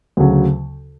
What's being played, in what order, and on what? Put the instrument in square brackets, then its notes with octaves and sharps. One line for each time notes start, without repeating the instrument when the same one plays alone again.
[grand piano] D2 C#3 F#3